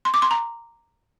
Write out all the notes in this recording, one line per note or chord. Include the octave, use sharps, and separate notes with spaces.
C6
D6
C6
A#5